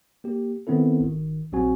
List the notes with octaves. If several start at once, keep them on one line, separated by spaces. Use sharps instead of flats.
A#3 G4
D#3 B3 C4 E4 A4
G#1 D#3
A#1 F#3 C4 F#4 G#5